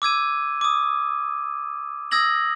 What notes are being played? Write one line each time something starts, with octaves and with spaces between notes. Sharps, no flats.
D6 E6 G#6 D#7
D6 D#6
D#6 E6 G#6 A#6 F#7